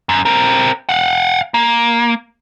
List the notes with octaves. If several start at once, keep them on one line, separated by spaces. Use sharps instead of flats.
F#2
C4 A#4
F5 F#5
A#3